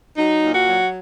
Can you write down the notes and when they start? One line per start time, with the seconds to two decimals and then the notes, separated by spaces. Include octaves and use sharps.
0.18 F#3 D#4
0.43 A#2
0.55 F#4
0.67 F#3